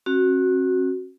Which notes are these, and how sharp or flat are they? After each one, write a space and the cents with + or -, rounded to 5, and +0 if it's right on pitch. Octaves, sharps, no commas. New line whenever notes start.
C4 +45 F#4 +0